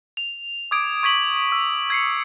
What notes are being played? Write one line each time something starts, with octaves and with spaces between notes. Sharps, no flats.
F7
D6 D#6 G#6 D7
C#6 G#6 B6 F#7
E6
G#6 C7 C#7